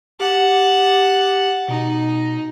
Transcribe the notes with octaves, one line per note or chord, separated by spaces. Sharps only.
G4 F#5 A5
B2 D#4